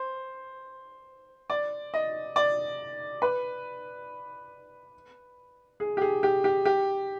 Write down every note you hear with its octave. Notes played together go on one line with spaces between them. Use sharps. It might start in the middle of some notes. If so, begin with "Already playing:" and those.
Already playing: C5
D5
D#5
D5
B4
G#4
G4
G#4
G4
G4
G4